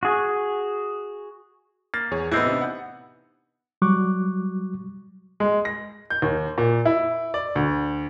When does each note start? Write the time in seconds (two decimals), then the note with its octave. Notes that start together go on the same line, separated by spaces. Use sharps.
0.03 F#4 G#4
1.94 A#3 A6
2.11 E2 G#4 C#5
2.32 A2 E3 B3 C4 D#4 E4
2.46 C3 D4
2.61 F#5
3.82 F#3 G3 F#4 C#6 D6 F#6
5.40 G#3
5.65 A#6
6.10 G6
6.22 D#2
6.58 A#2
6.85 E4
7.34 D5
7.55 D2